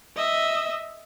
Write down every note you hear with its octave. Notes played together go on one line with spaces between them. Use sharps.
D#5 E5